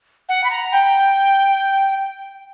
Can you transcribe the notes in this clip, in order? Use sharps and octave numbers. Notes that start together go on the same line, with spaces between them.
F#5
B5
A#5
G5